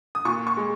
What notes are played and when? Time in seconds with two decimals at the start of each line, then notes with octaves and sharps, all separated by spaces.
0.15 D#6
0.25 A#2 C#6
0.47 C#6
0.57 G#3